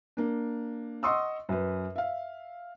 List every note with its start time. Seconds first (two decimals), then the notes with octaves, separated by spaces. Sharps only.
0.17 A#3 D4
1.03 D#5 F#5 C6 C#6 D#6 E6
1.49 F#2 B4
1.96 E5 F5